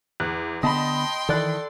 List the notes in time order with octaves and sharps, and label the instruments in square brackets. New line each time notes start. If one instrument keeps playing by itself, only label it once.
[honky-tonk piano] E2 [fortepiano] F#6
[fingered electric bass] D3 B3 [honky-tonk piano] D#5 A5 B5 [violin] G5 C6
[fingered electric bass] D#3 E3 [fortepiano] A4 D5 F#6